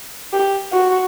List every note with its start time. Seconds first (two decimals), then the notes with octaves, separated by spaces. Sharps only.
0.33 G4
0.73 F#4